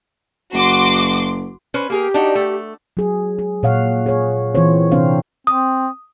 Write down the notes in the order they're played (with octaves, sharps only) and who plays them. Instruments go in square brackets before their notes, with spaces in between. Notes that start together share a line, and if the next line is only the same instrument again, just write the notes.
[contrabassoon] F#1 [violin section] F#4 C6 D6
[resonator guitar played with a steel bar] C#4 B4 C5
[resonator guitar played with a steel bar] A#3 G#4 A#4 [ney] G4
[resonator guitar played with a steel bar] D4 D#4 F#4
A3
[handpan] F#3 G#4
G#4
A#2 C#5 F5 F#5
G#4 C#5
E3 C4 F4 C5 C#5
C3 C4 D4 C5 F5
[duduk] C4 [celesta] D#6